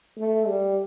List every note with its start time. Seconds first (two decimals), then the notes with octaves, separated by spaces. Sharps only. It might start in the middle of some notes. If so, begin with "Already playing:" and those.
0.17 A3
0.47 G3